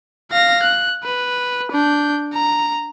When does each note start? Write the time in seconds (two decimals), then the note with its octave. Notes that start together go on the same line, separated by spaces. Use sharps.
0.32 F5 A#6
0.63 F#6
1.03 B4
1.72 D4 G6
2.34 A#5